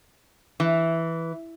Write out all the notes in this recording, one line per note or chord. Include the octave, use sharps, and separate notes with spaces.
E3